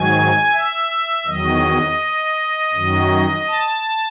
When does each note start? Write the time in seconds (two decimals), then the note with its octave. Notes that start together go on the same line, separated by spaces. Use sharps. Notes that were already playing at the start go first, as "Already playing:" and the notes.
Already playing: G#2 D#3 F#3 G#5
0.52 E5
1.26 E2 D#3 F#3 D#5
2.74 F#2 D#3 F#3
3.47 A5